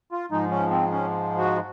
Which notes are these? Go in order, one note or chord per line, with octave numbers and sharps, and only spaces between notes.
F4
G#2 F3 G#3 D#4
C#4
C4
C#4
F#4